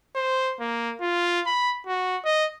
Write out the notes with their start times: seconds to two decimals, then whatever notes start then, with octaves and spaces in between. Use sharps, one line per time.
0.16 C5
0.60 A#3
1.01 F4
1.47 B5
1.87 F#4
2.25 D#5